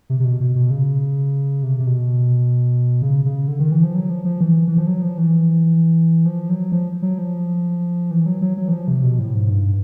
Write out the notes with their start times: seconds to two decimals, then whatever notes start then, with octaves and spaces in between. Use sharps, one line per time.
0.10 C3
0.20 C3
0.25 B2
0.40 B2
0.55 B2
0.70 C#3
1.63 C3
1.80 C3
1.86 B2
3.02 C#3
3.25 C#3
3.48 D3
3.59 D#3
3.72 E3
3.83 F3
3.95 F#3
4.10 F3
4.25 F3
4.41 E3
4.68 E3
4.77 F3
4.87 F#3
5.02 F3
5.18 E3
6.25 F3
6.49 F#3
6.72 F3
7.02 F#3
7.18 F3
8.11 E3
8.26 F#3
8.41 F#3
8.57 F#3
8.68 E3
8.72 F3
8.88 C3
9.04 B2
9.19 A2
9.34 G#2
9.50 G2